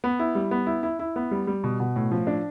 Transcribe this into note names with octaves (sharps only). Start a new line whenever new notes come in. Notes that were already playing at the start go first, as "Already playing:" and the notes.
B3
E4
G3
B3
E4
E4
E4
B3
G3
G3
B2
B2
A2
F3
D4